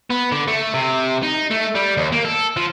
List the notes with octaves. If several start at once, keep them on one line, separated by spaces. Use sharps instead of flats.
B3
D3
A3
C3
D#4
A3
G3
D#2
A#3
A4
F3